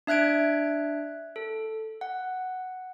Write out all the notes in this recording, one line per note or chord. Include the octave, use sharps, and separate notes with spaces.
D4 E5 F#6 G#6 D7
A4
F#5